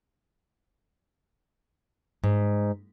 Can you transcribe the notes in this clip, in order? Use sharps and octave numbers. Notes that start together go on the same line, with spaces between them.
G#2